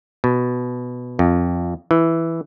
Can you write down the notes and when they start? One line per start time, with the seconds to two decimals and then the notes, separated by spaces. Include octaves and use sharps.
0.24 B2
1.19 F2
1.91 E3